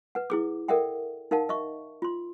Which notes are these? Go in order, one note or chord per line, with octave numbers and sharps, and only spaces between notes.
B4 F#5
E4 G#4 D6
A4 A#4 D5 E5 F#5 G5
D#4 A#4 F5 F#5 A5
D#5 E5 C#6
F4 C6